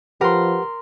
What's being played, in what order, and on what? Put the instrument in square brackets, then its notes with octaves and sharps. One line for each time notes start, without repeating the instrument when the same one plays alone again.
[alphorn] F3 [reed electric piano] G4 B4 F#5 [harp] A#4 C6